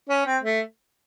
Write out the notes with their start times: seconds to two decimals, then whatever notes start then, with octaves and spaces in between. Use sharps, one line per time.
0.09 C#4
0.26 C4
0.43 A3